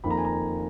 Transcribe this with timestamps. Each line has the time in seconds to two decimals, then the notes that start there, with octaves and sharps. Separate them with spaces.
0.04 F2 D#3 A#3 B5
0.10 A#5
0.17 G#5
0.25 A#5